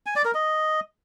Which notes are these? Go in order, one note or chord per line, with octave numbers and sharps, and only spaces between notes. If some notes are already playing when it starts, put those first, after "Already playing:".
G#5
D5
A#4
D#5